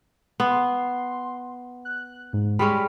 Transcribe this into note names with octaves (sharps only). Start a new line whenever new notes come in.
B3 C6
F#6
G#2
G3 G#3 C#4 B5